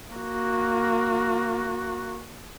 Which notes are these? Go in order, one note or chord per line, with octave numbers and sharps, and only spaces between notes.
A#3 F#4